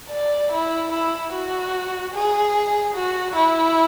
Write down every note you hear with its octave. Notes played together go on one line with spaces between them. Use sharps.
D5
E4
E4
F#4
G#4
F#4
E4